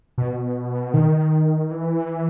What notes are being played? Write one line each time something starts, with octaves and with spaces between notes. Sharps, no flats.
B2
D#3
E3